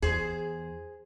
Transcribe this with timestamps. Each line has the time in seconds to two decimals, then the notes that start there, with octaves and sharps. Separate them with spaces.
0.02 E2 G#4 C5